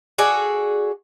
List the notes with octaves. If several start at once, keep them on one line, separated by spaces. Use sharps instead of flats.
F#4 G#4 A4 D5